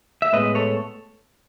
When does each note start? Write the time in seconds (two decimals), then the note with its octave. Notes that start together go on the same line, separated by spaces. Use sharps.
0.22 E5
0.33 A2 G#3 B3 B4 D#5
0.55 A4 C#5